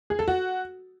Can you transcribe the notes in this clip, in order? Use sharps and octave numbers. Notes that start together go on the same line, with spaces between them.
G#4
A4
F#4